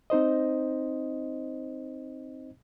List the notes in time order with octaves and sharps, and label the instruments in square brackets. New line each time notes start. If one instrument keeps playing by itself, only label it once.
[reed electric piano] C4 D#4 C5 D#5